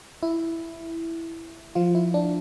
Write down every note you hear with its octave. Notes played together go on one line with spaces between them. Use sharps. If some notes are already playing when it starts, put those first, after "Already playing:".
E4
F3 F4
E4
D4